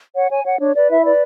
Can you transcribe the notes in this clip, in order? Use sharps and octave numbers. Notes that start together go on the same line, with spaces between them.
C#5 F#5
C#5 G#5
C#5 F#5
D4 C#5
B4 D5
E4 E5
B4 D5